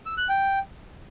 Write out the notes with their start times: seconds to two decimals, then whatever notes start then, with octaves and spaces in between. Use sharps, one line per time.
0.06 E6
0.17 F#6
0.29 G5